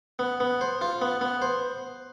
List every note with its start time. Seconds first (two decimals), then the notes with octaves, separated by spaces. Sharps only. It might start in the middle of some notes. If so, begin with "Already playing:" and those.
0.19 B3
0.40 B3
0.61 C5
0.81 F4
1.01 B3
1.21 B3
1.42 C5